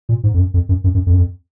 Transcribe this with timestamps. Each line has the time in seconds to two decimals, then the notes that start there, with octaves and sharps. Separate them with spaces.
0.09 A#2
0.24 G#2
0.34 F2
0.39 F#2
0.54 F2
0.69 F#2
0.84 F#2
0.95 F#2
1.06 F2
1.13 F#2
1.18 F2